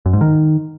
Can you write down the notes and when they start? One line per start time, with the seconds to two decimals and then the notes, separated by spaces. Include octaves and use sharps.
0.06 F#2
0.13 G#2
0.21 D#3